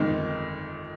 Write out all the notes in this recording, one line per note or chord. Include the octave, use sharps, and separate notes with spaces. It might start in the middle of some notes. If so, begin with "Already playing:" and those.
Already playing: G1 F2 D#3 G#3 D#4